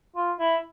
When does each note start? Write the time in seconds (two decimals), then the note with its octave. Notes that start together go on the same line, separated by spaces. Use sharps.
0.16 F4
0.40 E4